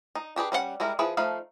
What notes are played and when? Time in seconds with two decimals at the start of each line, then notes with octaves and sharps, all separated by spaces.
0.15 D#4
0.36 D4 G4 G#4 B4
0.52 G3 C#4 D4 F#5
0.80 G3 G#3 E4 A#4
0.99 F3 E4 G#4 B4
1.17 F3 A3 D#4 F5 B5